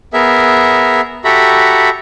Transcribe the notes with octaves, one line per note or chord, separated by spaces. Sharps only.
B3 G#4 A#4 E5
F#4 G4 A4 E5 A#5 B5